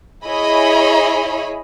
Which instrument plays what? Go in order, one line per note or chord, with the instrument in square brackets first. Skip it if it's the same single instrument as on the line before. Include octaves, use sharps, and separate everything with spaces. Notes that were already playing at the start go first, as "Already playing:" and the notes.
[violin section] E4 G#4 C#5 D#5 B5